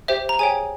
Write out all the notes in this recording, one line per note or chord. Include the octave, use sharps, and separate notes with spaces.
G4 C5 E5 G5
A#5
G#4 C#5 E5 G5 G#5